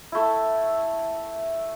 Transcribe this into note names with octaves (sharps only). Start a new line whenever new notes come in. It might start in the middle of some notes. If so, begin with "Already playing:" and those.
A3 E4